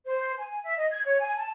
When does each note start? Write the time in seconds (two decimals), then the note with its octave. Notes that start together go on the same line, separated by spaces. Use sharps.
0.06 C5
0.37 G#5
0.63 E5
0.77 D#5
0.91 G#6
1.05 C#5
1.20 G#5
1.37 A5